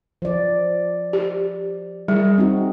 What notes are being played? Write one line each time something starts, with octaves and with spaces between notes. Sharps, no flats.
F3 D5
G4
G3 G#4
C4 D#4 F#4